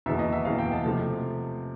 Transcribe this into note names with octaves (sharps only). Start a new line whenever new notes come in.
F#1 E2 B2 E5
D#5
E5
F#1 E2 B2 F5
G5
A5
C3 F3 A3